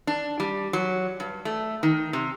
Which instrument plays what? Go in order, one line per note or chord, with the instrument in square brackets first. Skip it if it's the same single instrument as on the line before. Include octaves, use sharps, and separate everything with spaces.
[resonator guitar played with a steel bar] D4
G3
F#3
G2
A3
D#3
C3